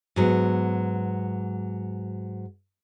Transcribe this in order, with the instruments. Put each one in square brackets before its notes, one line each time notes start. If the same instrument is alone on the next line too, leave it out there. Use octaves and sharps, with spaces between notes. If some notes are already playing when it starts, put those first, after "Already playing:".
[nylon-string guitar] G#2 F#3 B3